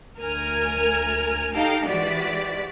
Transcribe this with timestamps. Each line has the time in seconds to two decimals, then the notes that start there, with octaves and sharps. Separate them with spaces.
0.18 D2 A#4 G#5 F6
1.54 D#4 G4 A4 F5 G5 A#5
1.86 G#2 E3 F#4 G4 D5 B6